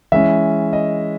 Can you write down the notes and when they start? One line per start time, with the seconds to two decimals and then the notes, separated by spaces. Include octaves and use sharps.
0.12 E3 G#3 C#4 E5
0.73 D#5